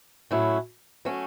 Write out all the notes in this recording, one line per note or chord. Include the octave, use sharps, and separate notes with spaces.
A2 F#3 C#4 E4
F#3 A3 C#4